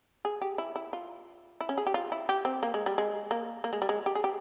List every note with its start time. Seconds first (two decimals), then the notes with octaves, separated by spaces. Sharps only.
0.25 G#4
0.41 G4
0.58 E4
0.76 E4
0.93 F4
1.61 E4
1.69 C#4
1.78 G#4
1.87 G4
1.94 F4
2.12 E4
2.29 G4
2.45 C4
2.63 A#3
2.74 G#3
2.86 G3
2.98 G#3
3.31 A#3
3.64 A#3
3.73 G#3
3.82 G3
3.89 G#3
4.06 G4
4.15 G#4
4.24 G4